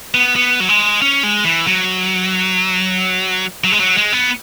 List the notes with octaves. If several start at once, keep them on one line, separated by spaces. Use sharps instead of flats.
B3
B3
F#3
G#3
C#4
G#3
E3
F#3
F#3
G#3
F#3
G#3
B3